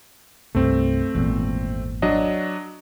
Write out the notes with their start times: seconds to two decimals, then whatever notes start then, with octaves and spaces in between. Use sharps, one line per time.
0.55 C2 G2 A3 C4
1.15 G#1 E2 A#2
2.02 F#3 D4 D#5